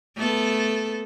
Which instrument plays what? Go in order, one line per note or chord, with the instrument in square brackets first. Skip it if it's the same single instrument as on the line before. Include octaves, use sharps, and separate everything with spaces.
[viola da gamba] A3 B3 A4